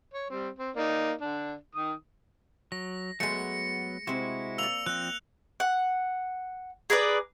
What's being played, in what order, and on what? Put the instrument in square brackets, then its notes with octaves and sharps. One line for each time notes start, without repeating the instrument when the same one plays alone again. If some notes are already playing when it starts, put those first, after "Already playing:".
[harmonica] C#5
G3 C4
C4
A#3 D#4 D5
D3 D4
D#3 D#6
[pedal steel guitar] F#3 [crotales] A#6
[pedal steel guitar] F#3 B3 [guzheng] G#3 A3 [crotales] C#7
[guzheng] C3 C4 [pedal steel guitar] G#3 E4 F#4
[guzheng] A#3 D5 [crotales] E6 F7
[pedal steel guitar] F3 C4 [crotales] F#6
[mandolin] F#5
G#4 A#4 B4 D5